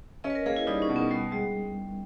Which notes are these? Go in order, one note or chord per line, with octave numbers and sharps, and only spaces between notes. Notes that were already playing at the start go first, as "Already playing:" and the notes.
C#4 D#5
B4
A#4
A#3 G#4
E4
G3 D#4
C#4
B2
B3
G3 B3
G3 G#3